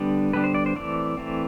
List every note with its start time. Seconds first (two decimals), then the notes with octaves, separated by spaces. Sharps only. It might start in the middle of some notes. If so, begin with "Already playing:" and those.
Already playing: D3 G3 B3 D4
0.33 D3 G3 B3 D4 B4
0.44 C5
0.54 D5
0.66 C5
0.76 E3 A3 C4 D5
1.17 E3 A3 C4